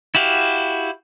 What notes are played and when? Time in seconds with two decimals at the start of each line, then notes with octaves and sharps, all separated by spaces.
0.15 E4 F#4 G4 F5